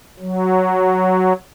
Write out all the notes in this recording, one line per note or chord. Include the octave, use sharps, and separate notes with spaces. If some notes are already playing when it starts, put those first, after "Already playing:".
F#3